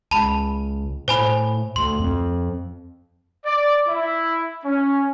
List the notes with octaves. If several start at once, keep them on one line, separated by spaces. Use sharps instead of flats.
C#2 A5 B5
A2 C5 G#5 B5
D2 C6
F2
D5
E4
C#4